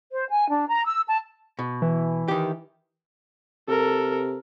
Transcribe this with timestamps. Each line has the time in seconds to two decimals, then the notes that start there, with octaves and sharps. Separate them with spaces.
0.11 C5
0.29 G#5
0.50 D4
0.68 A#5
0.86 E6
1.07 A5
1.59 B2
1.82 E3
2.28 D#3 G4
3.69 C3 A4 A#4